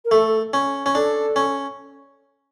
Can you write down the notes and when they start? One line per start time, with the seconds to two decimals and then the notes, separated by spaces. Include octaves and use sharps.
0.05 A#4
0.11 A3 A4
0.53 C#4
0.86 C#4
0.95 D4 A4
1.36 C#4